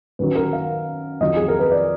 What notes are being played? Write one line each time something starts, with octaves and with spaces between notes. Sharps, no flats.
F#2 D#3 F#3 B4
A#4
F5
F2 D#3 F#3 D#5
G#4
A#4
B4
D5